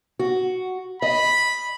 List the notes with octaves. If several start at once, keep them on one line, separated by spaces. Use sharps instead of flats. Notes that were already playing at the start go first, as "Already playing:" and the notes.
F#4
D#5 B5